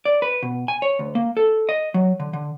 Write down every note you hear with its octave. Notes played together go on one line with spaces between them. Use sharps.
D5
B4
B2
G#5
C#5
D2
A#3
A4
D#5
F#3
D3
D3